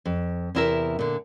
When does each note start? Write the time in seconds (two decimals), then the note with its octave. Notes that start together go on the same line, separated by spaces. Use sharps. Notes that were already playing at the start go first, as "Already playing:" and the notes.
0.06 F2
0.55 E2 C3 E4 A#4 E5
0.99 A#2 D3